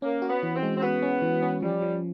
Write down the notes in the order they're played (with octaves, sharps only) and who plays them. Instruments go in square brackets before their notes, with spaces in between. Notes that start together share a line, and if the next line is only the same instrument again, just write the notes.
[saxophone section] A#3 [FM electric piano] C#4
[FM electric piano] F#4
[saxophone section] B3
[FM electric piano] E3
[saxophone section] C4
[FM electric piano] G#3
[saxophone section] C4
[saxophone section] B3 [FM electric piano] F#4
[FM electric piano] C#4
E3
C#4
[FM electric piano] F3 [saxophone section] G3
[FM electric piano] F3